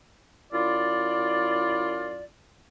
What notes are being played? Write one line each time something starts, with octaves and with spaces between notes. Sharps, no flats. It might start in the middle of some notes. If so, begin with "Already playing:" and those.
F#2 E4 F4 D5